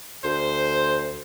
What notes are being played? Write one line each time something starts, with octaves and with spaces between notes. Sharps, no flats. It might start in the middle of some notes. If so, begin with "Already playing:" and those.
D2 C5